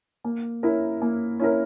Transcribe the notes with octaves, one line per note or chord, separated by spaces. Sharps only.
A#3
C#4 E4 A#4
A#3
C#4 E4 A#4